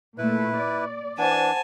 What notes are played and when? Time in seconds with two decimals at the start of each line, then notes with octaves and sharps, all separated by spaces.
0.18 A#2 A3 E4 B4
0.57 D5
1.18 E3 D4 C5 F#5 G#5 A5